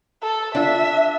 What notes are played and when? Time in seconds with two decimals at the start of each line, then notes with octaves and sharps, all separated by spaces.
0.22 A4
0.55 D4 F4 E5